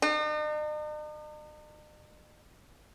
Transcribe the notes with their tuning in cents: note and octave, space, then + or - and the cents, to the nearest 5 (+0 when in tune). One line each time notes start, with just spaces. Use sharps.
D#4 -45